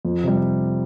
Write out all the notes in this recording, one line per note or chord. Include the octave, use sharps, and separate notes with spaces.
F2
C3 G3